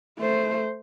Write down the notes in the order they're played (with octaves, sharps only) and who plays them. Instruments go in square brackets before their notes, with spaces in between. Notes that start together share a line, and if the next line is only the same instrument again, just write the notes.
[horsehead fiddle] A3 C5